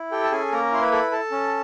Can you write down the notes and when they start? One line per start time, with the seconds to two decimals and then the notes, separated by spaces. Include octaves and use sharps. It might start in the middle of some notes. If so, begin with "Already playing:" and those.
Already playing: E4
0.11 G4 A4 G5
0.24 A5
0.32 C#4 G#4 G#5
0.52 A#3 A#4 A#5
0.72 E4 C6
0.82 B4 B5
0.92 A4
1.11 A4 A5
1.32 C#4